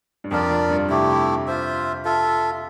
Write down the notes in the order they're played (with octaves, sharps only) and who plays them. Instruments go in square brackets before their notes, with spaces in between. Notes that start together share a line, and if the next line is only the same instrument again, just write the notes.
[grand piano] G2
[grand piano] F2 [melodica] D4 F4 A#4 D5
[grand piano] F2
G2
[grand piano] C3 [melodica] A3 E4 G4
[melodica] F4 C5 E5
F4 A4 E5